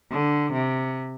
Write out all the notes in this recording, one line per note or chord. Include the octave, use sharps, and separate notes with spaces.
D3
C3